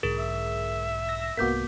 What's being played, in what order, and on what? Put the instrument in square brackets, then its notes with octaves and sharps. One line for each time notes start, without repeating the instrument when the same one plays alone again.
[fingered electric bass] B1 G#2 D3 [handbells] G#4 A#4
[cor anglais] E5
[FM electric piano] E6 A#6
[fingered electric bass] C2 G#2 [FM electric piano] A#3 B3 F#4 [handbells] D6 G6 B6